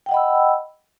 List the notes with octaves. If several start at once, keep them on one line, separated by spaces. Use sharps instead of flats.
D#5 F#5 G5 B5 E6